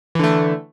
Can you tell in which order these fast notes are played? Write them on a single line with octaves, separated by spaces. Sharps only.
E3 D3 A3